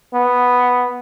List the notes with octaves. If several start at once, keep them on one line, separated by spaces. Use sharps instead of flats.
B3